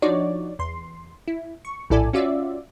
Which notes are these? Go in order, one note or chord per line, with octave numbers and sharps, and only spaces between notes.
F3 D4 D#4 F#4 C#5 D5
E2 C6
E4
C#6
A#1 A2 E4 A4 D5 G#5
C#4 F4 F#4 D5 E5